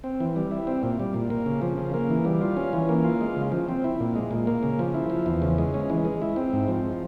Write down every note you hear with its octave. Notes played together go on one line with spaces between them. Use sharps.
C4
E3
G3
E4
C4
A#2
G3
A#2
A#3
C#3
F3
C#3
A#3
E3
G3
F4
C#4
E3
A#3
F4
G#3
C#3
F3
C4
E4
A#2
G#3
A#2
A#3
C#3
F3
E4
F3
E2
C#3
G#3
C#4
E3
G#3
E4
C4
G#2
F3